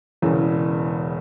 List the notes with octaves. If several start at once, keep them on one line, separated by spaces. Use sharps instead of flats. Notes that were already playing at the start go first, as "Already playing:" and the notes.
E1 E2 C#3 E3